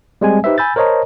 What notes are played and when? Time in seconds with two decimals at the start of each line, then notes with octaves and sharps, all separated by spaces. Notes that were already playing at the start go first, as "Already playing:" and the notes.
0.21 G3 G#3 C4 G#5
0.44 D#4 G4 B4 C5 E5
0.58 G#5 B5 E6 G6 A6
0.76 A#4 C5 C#5 D#5 A5 A#5